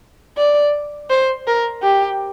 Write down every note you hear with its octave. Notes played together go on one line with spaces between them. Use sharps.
D5
C5
A#4
G4